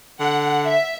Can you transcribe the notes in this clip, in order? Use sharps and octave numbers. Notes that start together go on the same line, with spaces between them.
D3 F#5
E5